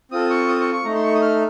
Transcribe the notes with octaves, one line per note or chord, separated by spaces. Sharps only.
C4 F4 A4 D#6
C#6
D#6
C#6
C#6
A3 D#4 A4 A#5
C6
C#6
D#6
F6